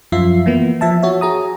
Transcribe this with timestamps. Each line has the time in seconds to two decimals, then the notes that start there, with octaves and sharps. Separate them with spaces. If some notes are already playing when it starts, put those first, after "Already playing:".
0.12 F#2 F3 F4 E5 C7
0.46 E3 A#3 B3
0.81 F3 E5 A5
1.02 F#4 C#5 E5
1.21 F#4 G#4 A#5 D#6